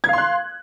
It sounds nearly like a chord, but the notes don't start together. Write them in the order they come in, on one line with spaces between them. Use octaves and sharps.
G#6 F5 C6 F#6